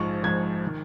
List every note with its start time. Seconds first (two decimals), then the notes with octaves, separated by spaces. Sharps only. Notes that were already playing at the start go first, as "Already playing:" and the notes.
Already playing: A#1 G#2 F3 C#6
0.23 A#1 G#2 F3 G#6
0.67 D#3